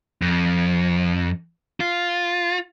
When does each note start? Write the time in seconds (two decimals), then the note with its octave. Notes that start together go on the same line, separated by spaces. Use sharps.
0.22 F2
1.80 F4